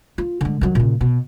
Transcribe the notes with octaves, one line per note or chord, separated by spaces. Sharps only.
F4
D3 G#3
D#3 F#3
A#2 C#3
B2